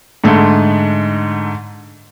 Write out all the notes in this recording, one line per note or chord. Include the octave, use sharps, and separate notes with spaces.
G#2 D3 G#3 A3